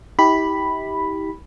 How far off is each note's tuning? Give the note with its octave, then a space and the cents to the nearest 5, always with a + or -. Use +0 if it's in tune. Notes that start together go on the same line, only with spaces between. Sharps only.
E4 -45 G4 +0 B5 +0